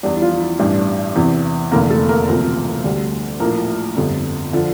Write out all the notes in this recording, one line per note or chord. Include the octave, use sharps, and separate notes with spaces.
E2 E3 G3 D4
E4
F3 F4
E4
A1 G2 E3 G3 D4
D4
E2 C3 E3
F1 E2 D3 A#3 A#4
A3 A4
A#3 A#4
E1 D2 C3 F3
D2 D3 G3
A#1 A2 F3 A#3 A#4
G1 F2 D3 G3
D3 F3